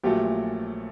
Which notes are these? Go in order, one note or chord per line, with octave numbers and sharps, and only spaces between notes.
A#1 A#2 F#3 A3 G4